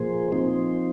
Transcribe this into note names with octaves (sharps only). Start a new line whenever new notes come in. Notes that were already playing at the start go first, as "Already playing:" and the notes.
Already playing: A#2 F3 A#3 G#4 C5
F3 C4 D#4 C5